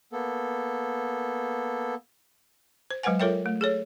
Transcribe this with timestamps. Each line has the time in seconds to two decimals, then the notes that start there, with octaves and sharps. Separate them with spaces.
0.12 A#3 B3 A4
2.91 C5
3.03 F#3 G#3 B4 C5 F#5 G#5
3.20 F4 A4 A#4 C#5 E5 G5
3.46 A3
3.61 G#4 A4 C#5